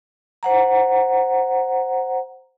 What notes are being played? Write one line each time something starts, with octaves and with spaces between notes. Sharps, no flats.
C5 F#5 A#5